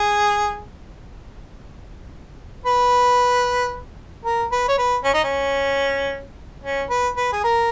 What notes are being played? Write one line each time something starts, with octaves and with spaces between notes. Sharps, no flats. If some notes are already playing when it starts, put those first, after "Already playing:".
Already playing: G#4
B4
A#4
B4
C#5
B4
C#4
D#4
C#4
C#4
B4
B4
G#4
A#4